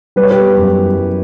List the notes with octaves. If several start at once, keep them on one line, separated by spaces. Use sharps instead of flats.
G3 B4
C#5
G4 B4
B3
F#2
E3
G3